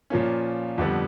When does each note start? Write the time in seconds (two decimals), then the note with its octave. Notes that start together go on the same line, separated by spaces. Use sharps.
0.10 A#2 F3 A#3 C#4
0.78 F2 D3 G3 B3